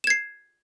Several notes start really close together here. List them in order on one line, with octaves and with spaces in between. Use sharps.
E7 G#6 C7